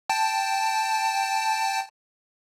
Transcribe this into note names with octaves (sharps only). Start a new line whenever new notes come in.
G5 A5